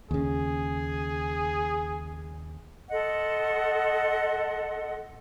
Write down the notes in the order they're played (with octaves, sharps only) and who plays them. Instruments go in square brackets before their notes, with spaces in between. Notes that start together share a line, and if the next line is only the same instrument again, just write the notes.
[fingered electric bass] D#2 C#3 [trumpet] G#4
[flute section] A4 D#5 F#5 C6